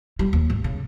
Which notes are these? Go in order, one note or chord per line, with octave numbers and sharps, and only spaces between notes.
G3
D#2
G#2
C#3